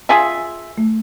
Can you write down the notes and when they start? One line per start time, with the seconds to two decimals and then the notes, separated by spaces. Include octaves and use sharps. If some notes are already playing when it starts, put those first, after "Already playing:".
0.09 F4 G#4 E5
0.78 A3